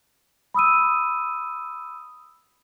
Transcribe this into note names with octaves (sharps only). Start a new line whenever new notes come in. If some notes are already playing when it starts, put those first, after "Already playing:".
B5 D#6 E6 D#7